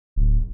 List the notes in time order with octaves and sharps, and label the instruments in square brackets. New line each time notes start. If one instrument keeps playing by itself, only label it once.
[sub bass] D1